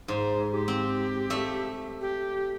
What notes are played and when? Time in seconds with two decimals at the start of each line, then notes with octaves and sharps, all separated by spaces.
0.08 G#2 C5
0.51 G4
0.68 C4
1.30 A3 E5
2.01 G4